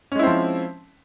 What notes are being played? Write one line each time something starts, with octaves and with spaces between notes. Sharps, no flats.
F3 G#3 C4 C#4 E4